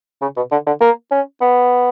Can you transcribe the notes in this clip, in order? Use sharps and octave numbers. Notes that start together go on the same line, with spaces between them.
C#3
B2
D3
D3
A#3
C#4
B3